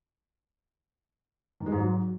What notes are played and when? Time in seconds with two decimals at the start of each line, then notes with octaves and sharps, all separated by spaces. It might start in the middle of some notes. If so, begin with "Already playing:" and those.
1.60 D#3
1.66 G#3
1.72 G#2
1.78 F#3